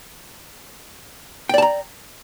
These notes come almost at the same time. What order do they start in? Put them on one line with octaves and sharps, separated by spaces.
G5 D5 A5 A#5